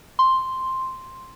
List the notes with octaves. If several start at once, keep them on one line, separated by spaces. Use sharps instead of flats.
C6